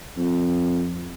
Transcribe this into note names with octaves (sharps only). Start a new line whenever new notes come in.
F2